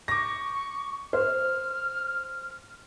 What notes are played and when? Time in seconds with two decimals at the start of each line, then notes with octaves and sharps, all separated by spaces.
0.08 C#6 D6 A#6
1.13 C5 F6